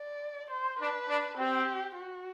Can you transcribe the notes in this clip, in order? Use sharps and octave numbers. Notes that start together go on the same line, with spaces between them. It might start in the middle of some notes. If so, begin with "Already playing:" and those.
Already playing: D5
C5
D4 B4
D4
C4 G4
F#4